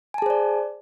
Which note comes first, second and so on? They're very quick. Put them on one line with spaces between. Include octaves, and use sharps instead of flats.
G#5 A5 G#4 C5 D5